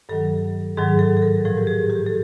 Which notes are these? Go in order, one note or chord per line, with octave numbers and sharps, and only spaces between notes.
G2 D#3 F#3 A4
G#2 D#3 F#3 G#4
A4
A4
A#4
A2 F3 A4
G4
G#4
G4
A4